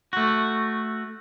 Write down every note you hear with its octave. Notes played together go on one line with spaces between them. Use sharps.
A3 F#4